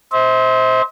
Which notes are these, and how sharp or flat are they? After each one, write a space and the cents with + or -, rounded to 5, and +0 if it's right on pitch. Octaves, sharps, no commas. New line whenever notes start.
C5 +0 E5 -45